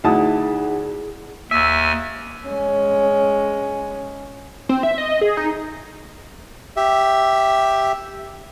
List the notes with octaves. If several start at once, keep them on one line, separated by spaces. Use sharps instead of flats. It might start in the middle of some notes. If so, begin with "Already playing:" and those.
D2 D#4 E4 G#4 F#5 A5 D#6
D#2 E5 G#5
G#3 C#4
C4
E5
D#5
G#4
D#4
G4 E5